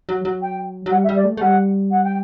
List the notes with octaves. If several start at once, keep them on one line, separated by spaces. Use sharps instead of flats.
F#3
F#3
G5
F#3
G3 F#5
E5
G3
D5
A3
A3
G3 F#5
F#5
G5